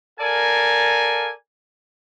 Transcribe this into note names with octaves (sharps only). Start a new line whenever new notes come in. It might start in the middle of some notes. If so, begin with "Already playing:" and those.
A4 A#4 D5 F5 G#5